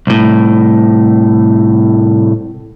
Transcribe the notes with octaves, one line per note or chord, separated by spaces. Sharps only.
C2 A2